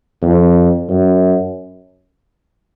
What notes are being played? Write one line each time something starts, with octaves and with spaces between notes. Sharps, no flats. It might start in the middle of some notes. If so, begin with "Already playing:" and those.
F2
F#2